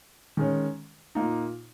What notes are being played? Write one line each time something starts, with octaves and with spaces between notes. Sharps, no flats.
D#3 G#3 C#4
A#2 A#3 D#4